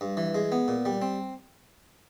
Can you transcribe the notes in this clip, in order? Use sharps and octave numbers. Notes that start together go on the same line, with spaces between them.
G2
E3
G#3
B3
A#2
G3
C4